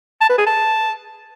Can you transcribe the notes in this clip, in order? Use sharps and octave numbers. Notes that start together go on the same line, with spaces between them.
A5
B4
G#4
A5